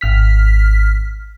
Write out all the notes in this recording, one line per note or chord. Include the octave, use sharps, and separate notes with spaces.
G#1 F6 B6